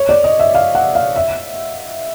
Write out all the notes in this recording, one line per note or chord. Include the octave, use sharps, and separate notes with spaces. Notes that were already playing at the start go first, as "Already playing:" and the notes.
Already playing: C#5
D5
D#5
E5
F5
F#5
F5
E5